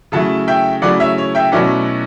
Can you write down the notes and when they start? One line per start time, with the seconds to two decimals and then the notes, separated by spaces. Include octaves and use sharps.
0.12 C#3 F#3 A3 E4 F#5 A5
0.48 E5 G5
0.82 C#3 F#3 A3 E4 D5 F#5
1.00 C#5 E5
1.18 C#5
1.35 E5 G5
1.52 B2 F#3 A3 C#4 E4 D5 F#5